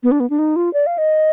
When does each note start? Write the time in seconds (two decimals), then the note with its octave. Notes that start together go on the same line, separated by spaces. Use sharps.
0.03 B3
0.12 D4
0.20 B3
0.30 D4
0.39 D#4
0.56 F4
0.74 D5
0.87 F5
0.98 D#5